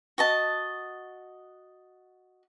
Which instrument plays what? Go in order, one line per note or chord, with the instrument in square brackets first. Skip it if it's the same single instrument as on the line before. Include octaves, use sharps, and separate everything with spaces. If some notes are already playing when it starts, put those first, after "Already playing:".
[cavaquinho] F#4 D#5 A5